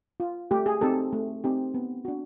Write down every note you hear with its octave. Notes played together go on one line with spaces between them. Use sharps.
F4
A3 G4
G#4
C4 D#4 G4 A4
A3
C4 D#4 G4
B3
D4 F#4